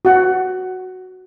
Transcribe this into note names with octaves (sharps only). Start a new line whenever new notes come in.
F#4 F#5